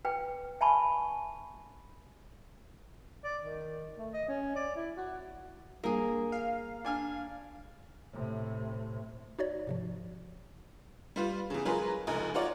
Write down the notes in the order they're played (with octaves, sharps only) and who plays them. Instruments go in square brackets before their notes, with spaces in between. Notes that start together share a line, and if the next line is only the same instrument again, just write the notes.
[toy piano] B4 G5
E5 G#5 A5 B5 C#6
[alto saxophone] D5
D#3
A3
D#5
C#4
D5
E4
F#4
[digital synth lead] G2 [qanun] A#3 G#4
[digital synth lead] F5
[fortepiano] D4 G#5 F6
[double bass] A2 C3
[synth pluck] D#4 F#4 C#5 D5
G#2 C3 F3
[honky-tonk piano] G3 F4 B4
E2 C#3
F#3 G#3 F4 G#4 A#4 B4
F1 C#2 D#4
D#4 F4 F#4 C#5 D5